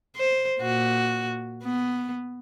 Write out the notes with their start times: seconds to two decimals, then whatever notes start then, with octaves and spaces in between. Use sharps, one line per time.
0.16 C5
0.61 A#2 F#4
1.64 B3